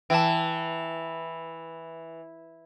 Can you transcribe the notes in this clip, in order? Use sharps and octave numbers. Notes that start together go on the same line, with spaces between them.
E3 G5 A5